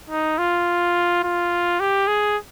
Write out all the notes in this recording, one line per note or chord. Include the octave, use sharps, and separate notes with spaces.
D#4
F4
F4
G4
G#4